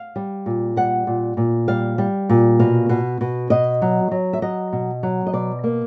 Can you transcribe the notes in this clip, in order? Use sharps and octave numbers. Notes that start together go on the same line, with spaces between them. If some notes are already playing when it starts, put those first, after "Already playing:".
Already playing: F5
G3
A#2
G3 F#5
A#2
A#2
G3 F5
G3
A#2
B2 F5
B2
B2
B2 D#5
F#3
F#3
E5
F#3 D#5
B2
F#3
D#5
B2 D5
A#3